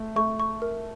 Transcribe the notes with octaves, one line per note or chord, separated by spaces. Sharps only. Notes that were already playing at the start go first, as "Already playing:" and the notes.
Already playing: A3
A3 C#6
C#6
A#4